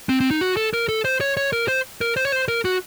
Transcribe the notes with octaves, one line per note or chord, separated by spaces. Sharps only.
C4
C4
D#4
F#4
A4
A#4
A4
C5
C#5
C#5
A#4
C5
A#4
C5
C#5
C5
A#4
F#4